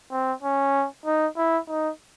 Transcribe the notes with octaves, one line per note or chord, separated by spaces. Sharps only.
C4
C#4
D#4
E4
D#4